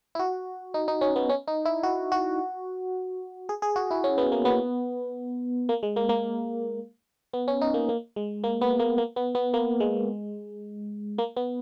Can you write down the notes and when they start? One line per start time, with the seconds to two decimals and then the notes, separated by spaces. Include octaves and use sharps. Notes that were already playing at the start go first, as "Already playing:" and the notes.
0.15 E4
0.19 F#4
0.74 D#4
0.88 D#4
1.01 C#4
1.16 B3
1.29 C#4
1.48 D#4
1.65 E4
1.83 F#4
2.12 F#4
3.49 G#4
3.62 G#4
3.76 F#4
3.91 E4
4.04 C#4
4.18 B3
4.32 A#3
4.45 B3
5.69 A#3
5.83 G#3
5.96 A#3
6.09 A#3
7.33 B3
7.48 C#4
7.61 D#4
7.74 A#3
7.89 A#3
8.16 G#3
8.44 A#3
8.61 B3
8.79 A#3
8.98 A#3
9.16 B3
9.35 B3
9.54 A#3
9.80 G#3
11.18 A#3
11.37 B3